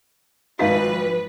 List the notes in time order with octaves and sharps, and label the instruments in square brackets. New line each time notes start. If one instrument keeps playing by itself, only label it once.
[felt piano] G#1 D#4 B6 [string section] F3 B4 [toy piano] F#4 E5 F5